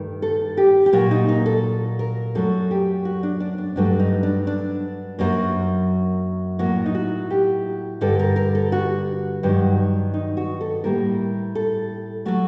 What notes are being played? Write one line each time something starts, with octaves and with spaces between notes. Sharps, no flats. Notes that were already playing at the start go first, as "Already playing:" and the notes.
Already playing: G2 D#3 A3
A4
G4
G4
A#2 F#3 A#3 F#4
D#4
D#4
A4
A#4
F#2 F#3 A3 A4
G4
F#4
D4
D4
D4
G2 F#3 A3 D4
D#4
D4
D4
F#2 F#3 A#3
A2 F#3 A#3 F#4
D#4
F#4
G4
G2 D3 G3 A4
A#4
A#4
A4
F#4
G2 D#3 F#3
D#4
F#4
A4
A2 G3 A#3 A#4
A4
F#3 A3 F#4